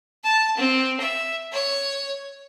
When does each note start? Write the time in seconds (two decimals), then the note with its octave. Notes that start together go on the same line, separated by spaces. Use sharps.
0.24 A5
0.57 C4
1.00 E5
1.52 C#5